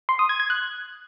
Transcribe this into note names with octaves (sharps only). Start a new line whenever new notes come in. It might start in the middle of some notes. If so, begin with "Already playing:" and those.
C6
D#6
G#6
G#6
F#6